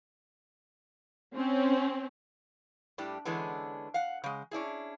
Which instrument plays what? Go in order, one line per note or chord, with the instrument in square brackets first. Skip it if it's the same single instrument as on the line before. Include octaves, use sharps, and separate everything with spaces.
[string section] C4 C#4
[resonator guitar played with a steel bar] A2 G3 D4 G4
D3 E3 G#3 B3 C#4 D4
F5 F#5
C#3 G#3
C#4 D4 E4 G#4